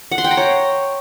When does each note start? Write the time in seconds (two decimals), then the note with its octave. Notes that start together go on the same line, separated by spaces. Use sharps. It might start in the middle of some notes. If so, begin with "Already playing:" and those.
0.12 F#5
0.18 C6
0.24 G5
0.31 A#5
0.37 C#5